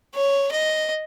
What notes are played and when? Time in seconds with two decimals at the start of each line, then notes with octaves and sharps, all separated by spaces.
0.14 C#5
0.52 D#5